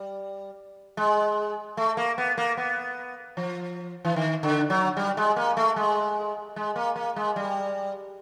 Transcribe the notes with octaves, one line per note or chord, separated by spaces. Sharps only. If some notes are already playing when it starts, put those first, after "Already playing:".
Already playing: G3
G#3
A3
A#3
B3
A#3
B3
F3
E3
D#3
D3
F#3
G3
G#3
A#3
A3
G#3
G#3
A#3
A#3
G#3
G3